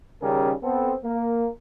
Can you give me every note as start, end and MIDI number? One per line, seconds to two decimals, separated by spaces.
0.22 0.52 39
0.22 0.52 49
0.22 0.52 55
0.22 0.52 61
0.22 0.52 68
0.22 0.52 70
0.62 0.92 59
0.62 0.92 60
0.62 0.92 69
1.04 1.46 58